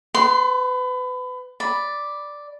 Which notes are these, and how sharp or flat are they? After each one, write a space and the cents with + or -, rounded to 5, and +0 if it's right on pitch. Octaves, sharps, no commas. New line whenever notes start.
B4 +30 C6 -20
D5 +0 B5 +0